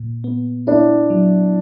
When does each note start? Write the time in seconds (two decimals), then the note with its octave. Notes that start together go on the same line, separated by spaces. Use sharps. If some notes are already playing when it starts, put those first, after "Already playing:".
Already playing: A#2
0.24 B3
0.67 D4 E4
1.10 F#3